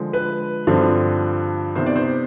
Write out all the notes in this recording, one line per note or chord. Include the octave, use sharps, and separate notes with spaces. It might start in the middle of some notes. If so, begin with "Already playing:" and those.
Already playing: D3 F3 G#3
B4
G2 D3 F3 C4
C3 D#3 B3 C5
D5
C5